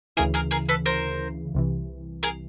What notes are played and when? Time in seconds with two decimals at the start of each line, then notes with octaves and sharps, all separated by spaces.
0.17 D2 C#3 E3 G#4 A#4
0.34 G#4 A#4
0.51 G#4 A#4
0.69 A4 B4
0.86 A#4 C5
1.55 C2 C3 E3
2.23 G#4 A#4